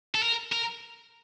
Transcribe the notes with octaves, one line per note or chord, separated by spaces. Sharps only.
A4
A#4
A#4